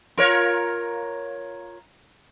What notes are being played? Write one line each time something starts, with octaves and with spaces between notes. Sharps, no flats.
F4 A#4 C#5